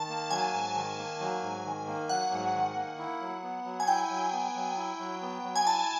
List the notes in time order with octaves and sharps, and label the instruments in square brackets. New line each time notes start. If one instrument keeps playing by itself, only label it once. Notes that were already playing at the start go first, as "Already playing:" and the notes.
Already playing: [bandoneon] D#3 [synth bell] A5
[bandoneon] A#3
[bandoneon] F#3 [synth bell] G#5
[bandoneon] G#2
D#3
A#3
F#3
G#2
D#3
A#3
[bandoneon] F#3 [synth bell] F#5
[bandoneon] G#2
D#3
A#3
E4
F#3
B3
F#3
[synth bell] G#5
[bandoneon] E4 [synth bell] G5
[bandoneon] F#3
B3
F#3
E4
F#3
B3
F#3
[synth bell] G#5
[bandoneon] E4 [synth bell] A5